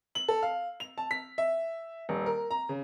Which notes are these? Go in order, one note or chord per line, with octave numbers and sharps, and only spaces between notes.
F#7
A4
F5
F7
A5
B6
E5
D#1
A#4
A#5
C#3